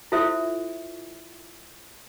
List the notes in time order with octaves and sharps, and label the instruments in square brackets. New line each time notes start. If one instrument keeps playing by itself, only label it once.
[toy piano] E4 F4 A4 C5 E5